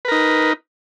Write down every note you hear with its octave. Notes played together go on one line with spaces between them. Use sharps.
D#4 A#4 B4